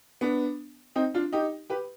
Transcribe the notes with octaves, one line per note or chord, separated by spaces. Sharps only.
B3 D4
C4 D#4
D4 F4
D#4 G4
G4 B4